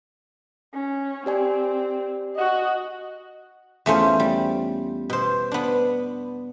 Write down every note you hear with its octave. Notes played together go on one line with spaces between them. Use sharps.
C#4
C4 G4 D5 G#5
F#4 D#5
E2 A3 C#4 F4 C5
G3
B2 C5
B3 D4